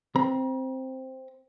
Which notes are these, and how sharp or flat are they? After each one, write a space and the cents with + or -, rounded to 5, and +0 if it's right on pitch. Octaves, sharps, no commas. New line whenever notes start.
C4 +0 A#5 +40